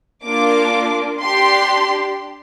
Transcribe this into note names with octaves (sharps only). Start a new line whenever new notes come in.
A#3 D4 F4 D6
D4 G4 C6